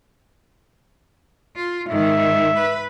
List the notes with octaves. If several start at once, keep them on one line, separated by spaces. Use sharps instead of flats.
F4
G#2 D#3 E5
B4